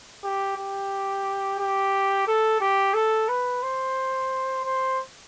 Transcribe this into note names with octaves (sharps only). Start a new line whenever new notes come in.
G4
G4
G4
A4
G4
A4
B4
C5
C5